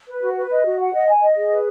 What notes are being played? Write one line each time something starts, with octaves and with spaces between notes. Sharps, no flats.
B4
F#4
B4
D#5
F#4
F#5
D#5
G#5
D#5
G#4
B4